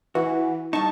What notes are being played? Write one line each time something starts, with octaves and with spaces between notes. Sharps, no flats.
E3 F#4
G2 D#4 A5 C#6